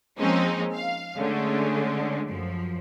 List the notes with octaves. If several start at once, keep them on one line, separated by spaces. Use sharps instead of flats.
F3 G#3 A#3 C4 C#4 D#4
F5
D3 G#3 A3 C#4
F#2 F3